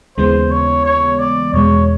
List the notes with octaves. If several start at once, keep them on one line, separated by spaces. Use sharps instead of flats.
D#2 C#3 E3 G#3 B3 C5
C#5
C#5
D5
E2 B2 G#3 C#5